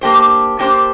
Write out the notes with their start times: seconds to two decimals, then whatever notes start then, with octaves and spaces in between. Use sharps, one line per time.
0.01 A#3 D4 G4 C5
0.59 A#3 D4 G4 C5